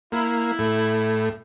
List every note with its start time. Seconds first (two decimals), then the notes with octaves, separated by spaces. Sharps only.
0.12 A#3 E4
0.59 A2